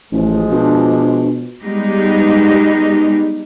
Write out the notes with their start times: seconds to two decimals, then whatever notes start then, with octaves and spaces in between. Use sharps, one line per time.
0.12 A1 F3 G#3
0.51 B2 D4
1.63 G3 G#3 B3 D#4 G4